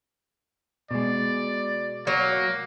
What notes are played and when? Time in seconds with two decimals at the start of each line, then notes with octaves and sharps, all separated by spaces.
0.91 B2 G#3 D5
2.07 F#3 A#3